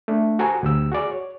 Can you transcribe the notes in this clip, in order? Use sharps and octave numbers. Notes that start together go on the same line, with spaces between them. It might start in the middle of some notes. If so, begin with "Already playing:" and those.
A3 D4
F#4 G4 A4 C5 G#5 A#5
D2 G4 E6
F#4 G#4 D5
C#5